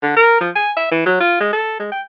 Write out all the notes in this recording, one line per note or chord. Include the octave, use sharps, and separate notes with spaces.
D3
A#4
F3
G#5
E5
E3
F#3
F4
G#3
A4
G#3
G5